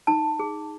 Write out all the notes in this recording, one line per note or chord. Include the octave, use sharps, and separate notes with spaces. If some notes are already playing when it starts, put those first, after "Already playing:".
D#4 A5
G#4